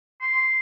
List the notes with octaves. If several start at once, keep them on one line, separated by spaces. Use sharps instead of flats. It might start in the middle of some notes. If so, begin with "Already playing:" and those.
C6